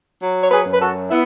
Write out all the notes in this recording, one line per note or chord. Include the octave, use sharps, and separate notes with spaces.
F#3
C#5
G#4 B4
F#2
B4
F#4 A4
B3 E4